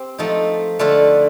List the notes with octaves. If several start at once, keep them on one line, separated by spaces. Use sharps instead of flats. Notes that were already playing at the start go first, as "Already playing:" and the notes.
Already playing: C4 G4
F3 A3 D#4
D3 A3 D4 F4